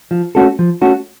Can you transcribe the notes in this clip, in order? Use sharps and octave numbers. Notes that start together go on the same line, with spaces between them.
F3
A3 C#4 F#4 A4
F3
A3 C#4 F#4 A4